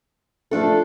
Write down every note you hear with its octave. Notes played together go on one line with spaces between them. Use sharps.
F3 A3 D4 A4